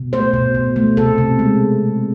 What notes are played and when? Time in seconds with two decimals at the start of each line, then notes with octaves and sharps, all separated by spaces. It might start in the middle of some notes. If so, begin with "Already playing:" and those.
Already playing: B2
0.13 A3 C5
0.34 B2
0.55 B2
0.76 A3
0.97 C3 A4
1.18 C3
1.39 G#3